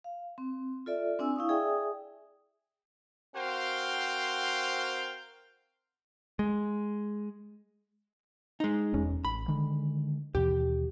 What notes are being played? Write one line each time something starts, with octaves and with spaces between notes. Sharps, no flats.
F5
C4
F4 A4 D5 E5
C4 D4 G#5 E6
E4 F5 C#6 D#6
G#4 D5 E5 G5 G#5 D#6
C4 F#4 A#4 C5 F5 G5
G#3
G#3 D#4
E1 E2 C#4
A1 B5
D3 D#3 G#3
D#2 B2 E3 G4